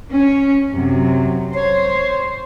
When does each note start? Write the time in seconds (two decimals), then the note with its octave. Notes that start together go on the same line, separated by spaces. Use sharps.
0.14 C#4
0.73 F#2 C3 F#3
1.54 C5 C#5